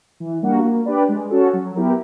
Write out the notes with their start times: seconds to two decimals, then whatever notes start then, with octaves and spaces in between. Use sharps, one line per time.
0.20 E3
0.42 G3 A#3 D4 F#4
0.63 A#3
0.86 D4 G4 B4 D5
1.08 G#3
1.30 C#4 F#4 A4
1.53 F#3
1.75 B3 E4 G4 A#4